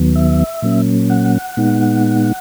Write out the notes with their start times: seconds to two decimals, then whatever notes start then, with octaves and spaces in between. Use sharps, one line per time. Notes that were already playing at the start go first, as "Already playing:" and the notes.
Already playing: D#2 D#3 F#3 B3
0.16 E5
0.62 A#2 F#3 A#3 C#4
1.10 F#5
1.57 A#2 G#3 B3 D#4